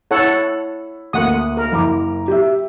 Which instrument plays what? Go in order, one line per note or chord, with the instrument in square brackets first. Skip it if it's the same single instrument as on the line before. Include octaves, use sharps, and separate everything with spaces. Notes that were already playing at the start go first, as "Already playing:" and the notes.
[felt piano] E4 [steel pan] A4 C#5 F#5
[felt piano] D2 A#3 [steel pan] F#5 D#6
[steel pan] A#4
[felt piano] F#1 A#5 D6
G4 E5